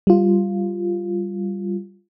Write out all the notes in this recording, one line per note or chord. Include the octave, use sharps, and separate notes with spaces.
G3 F4